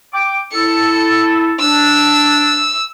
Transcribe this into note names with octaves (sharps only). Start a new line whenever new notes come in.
G5 D6
E4 A4 C#7
D4 E6